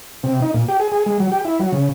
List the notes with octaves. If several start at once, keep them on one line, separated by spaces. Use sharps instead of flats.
C3
D#4
A#2
G4
G#4
G#4
G#3
F#3
G4
E4
F#3
C#3